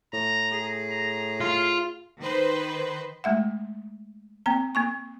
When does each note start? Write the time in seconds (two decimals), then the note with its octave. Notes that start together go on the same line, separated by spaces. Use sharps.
0.13 A2 A#5
0.52 G#4
0.89 A#5
1.41 F4 F5
2.19 D#3 B4 C5
3.24 G#3 A3 E5 F#5
4.46 A#3 C4 G5 A#5
4.75 A#3 G#5 C#6